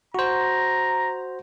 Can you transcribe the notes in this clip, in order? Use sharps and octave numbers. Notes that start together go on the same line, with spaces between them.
F#4 C5 A#5